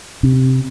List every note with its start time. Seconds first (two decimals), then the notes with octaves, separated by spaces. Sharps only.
0.23 C3